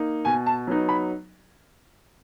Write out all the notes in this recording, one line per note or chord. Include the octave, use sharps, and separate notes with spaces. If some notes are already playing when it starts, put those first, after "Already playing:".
Already playing: A#3 D#4
B2 G#5
A5
F#3 B3 D#4
B5